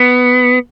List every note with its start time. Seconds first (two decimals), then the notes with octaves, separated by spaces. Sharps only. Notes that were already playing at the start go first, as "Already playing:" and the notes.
Already playing: B3